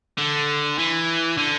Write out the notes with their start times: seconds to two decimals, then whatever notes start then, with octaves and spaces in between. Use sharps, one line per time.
0.18 D3
0.78 E3
1.38 D3